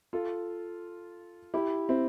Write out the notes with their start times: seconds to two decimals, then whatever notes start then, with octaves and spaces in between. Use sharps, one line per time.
0.13 F4 A4
1.54 E4 G4
1.89 C4 E4